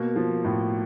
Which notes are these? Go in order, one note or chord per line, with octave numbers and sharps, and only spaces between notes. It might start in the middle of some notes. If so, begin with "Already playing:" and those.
Already playing: B2 A#3
F3
A2